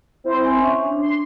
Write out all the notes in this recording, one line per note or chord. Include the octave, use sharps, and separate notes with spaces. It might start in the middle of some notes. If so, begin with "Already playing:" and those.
C4 E4 C5
G#5 C6
C#4 E5 C6 C#6
D4
C6